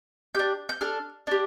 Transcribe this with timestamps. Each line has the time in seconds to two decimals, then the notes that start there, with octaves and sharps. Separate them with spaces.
0.35 D4 G4 G6
0.69 G6
0.81 D4 A4 F6
1.27 D4 G4